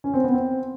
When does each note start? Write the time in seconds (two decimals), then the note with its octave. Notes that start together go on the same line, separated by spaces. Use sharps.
0.04 C#4
0.14 C4
0.24 B3
0.34 C4